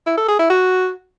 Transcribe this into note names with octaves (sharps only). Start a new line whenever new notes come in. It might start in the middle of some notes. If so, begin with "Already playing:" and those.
E4
A4
G#4
E4
F#4